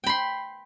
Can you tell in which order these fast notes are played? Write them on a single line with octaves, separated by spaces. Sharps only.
G5 B5 C6